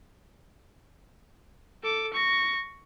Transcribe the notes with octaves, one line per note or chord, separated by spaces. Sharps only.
A4 D6
C#6 A#6